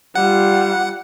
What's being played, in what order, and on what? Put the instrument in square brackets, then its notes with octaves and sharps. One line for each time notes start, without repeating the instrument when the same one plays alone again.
[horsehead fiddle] G3 F4 [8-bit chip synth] F#5